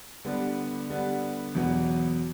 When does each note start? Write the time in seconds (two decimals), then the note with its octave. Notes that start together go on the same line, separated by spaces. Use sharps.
0.25 D3 G3 B3 D4
0.90 D3 G3 B3 D4
1.55 E2 B2 F#3 B3